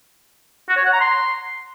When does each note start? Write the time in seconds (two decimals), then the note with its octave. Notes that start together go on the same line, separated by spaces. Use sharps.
0.69 F#4
0.77 C#5
0.85 F#5
0.92 A#5
1.00 C6